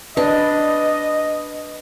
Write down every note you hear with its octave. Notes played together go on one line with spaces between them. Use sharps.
D4 B4 D#5